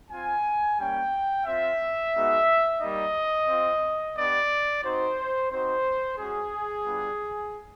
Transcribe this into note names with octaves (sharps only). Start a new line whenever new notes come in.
C4 F4 G#5
G3 A#3 C#4 G5
C4 F4 E5
G#3 B3 D#4 F#4
G3 A#3 D#4 D#5
C4 F4
B3 D4 G4 D5
C4 D#4 F#4 C5
C4 D#4 F#4 C5
G#3 C#4 F#4 G#4
G3 B3 D4 F4